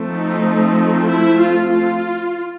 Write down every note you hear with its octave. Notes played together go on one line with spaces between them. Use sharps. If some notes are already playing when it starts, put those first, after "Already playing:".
Already playing: F3 A3 C4
D#4
E4
F4
F4